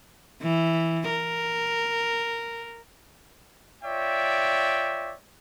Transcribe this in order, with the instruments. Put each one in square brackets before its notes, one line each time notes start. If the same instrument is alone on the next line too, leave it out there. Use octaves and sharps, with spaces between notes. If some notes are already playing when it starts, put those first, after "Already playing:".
[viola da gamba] E3
A#4
[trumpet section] F4 C#5 D5 E5 G5